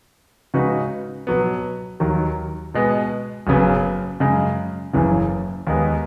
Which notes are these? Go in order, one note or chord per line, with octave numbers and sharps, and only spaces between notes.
C#3 G#3 D#4 F#4 B4
B2 F#3 B3
D#2 D#3 F#3
B2 G#3 B3
F#1 F#2 C#3 F#3 B3
F#2 C#3 G#3
F#1 F#2 C#3 E3
D#2 D#3 G#3 B3